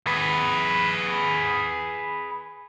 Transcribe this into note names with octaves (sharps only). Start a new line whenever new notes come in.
G#4 B4